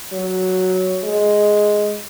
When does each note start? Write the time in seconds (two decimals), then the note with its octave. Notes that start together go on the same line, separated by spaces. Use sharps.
0.12 F#3
1.04 G#3